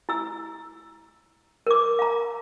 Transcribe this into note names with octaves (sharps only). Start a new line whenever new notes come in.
E4 E6
A#4 D6
F5 A#5